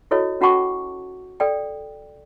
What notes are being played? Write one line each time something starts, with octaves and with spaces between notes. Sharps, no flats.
E4 F#4 A4 C#5 D#5
C#4 F#4 F#5 A5 C#6 D6
A4 D5 G5